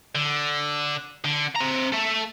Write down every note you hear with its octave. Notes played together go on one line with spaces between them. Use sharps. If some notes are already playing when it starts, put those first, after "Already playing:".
D3
D3
C4 A#5
A4 E5